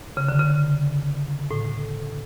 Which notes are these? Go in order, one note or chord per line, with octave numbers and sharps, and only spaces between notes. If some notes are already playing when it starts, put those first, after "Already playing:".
C#3
D3
C#3
A2